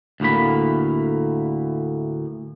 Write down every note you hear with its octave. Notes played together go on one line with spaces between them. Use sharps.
D2 A2 A#3 B5